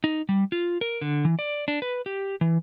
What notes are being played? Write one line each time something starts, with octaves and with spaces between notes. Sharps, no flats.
D#4
G3
F4
A#4
D3
E3
D5
D4
B4
G4
E3